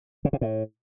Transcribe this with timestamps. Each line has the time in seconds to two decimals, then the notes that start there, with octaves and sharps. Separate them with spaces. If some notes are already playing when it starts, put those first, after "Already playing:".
0.25 C#3
0.33 C3
0.41 A2